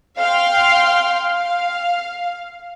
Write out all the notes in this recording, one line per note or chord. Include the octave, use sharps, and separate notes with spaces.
F5 G5 C6 F6
F5